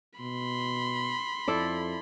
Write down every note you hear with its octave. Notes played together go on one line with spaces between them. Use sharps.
B2 B5 C6
F2 E4 A4 D5